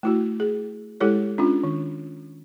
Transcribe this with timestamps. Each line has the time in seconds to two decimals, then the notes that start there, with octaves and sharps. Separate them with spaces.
0.03 A3 E4 F#4
0.40 G#4
1.00 G#3 E4 G4 A4 C#5
1.38 C#4 D4 F4
1.64 D#3